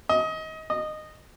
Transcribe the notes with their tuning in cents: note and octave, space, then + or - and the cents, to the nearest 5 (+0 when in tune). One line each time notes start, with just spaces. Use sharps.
D#5 +25
D#5 -15